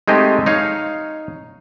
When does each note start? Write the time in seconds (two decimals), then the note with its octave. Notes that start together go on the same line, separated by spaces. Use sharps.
0.08 G#3 A3 C4 D#4 G4 D#5
0.46 D#4 C#5 F5